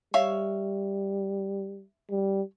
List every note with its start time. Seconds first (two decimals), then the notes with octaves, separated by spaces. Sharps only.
0.14 G3 C#5 E5 F5
2.10 G3